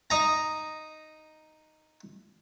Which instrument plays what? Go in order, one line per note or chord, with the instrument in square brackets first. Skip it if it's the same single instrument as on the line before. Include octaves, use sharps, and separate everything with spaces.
[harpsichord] D#4 A#5